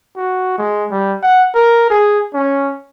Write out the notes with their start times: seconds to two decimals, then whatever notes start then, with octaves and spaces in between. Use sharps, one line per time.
0.16 F#4
0.58 G#3
0.91 G3
1.23 F#5
1.55 A#4
1.90 G#4
2.34 C#4